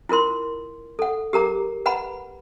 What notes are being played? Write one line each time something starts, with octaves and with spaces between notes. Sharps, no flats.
E4 F4 A#4 C6
A4 F#5
G4 A#4 A#5 D6
B4 F#5 A#5 B5